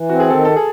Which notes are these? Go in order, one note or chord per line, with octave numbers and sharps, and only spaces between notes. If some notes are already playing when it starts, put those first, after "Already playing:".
Already playing: E3
C4 F#4
G#4
D#3 A4
A4
G#4